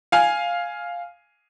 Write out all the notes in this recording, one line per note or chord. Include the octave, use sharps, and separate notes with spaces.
F5 G#5